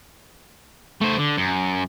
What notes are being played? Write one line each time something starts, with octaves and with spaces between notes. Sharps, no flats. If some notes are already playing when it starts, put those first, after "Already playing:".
A3 C5
D3
F#2